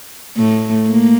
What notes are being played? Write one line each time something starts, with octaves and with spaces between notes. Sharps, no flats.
A2 A3
A#3